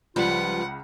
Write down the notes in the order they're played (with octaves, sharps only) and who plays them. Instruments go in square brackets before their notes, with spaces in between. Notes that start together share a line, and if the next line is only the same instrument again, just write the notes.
[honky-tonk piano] C#2 [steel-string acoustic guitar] F3 G3 B4 [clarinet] F4 [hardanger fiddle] F#5